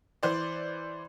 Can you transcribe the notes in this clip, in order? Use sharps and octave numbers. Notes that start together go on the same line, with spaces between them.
E3 C5 D5